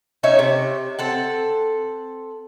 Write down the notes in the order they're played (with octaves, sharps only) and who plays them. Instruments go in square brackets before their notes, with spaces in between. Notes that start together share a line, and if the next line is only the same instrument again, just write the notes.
[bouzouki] C#4 D#4 C#5 E5
C3
C4 A4 F#5